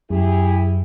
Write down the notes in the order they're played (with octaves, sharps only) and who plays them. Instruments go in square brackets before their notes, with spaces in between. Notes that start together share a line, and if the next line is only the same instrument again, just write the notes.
[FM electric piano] F#2 [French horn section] E4 G4 G#4